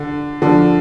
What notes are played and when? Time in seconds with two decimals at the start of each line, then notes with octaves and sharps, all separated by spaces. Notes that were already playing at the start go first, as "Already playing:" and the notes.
Already playing: D3
0.42 D3 F3